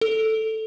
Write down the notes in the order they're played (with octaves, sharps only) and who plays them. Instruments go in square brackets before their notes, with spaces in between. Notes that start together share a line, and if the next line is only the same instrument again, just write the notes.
[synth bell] A4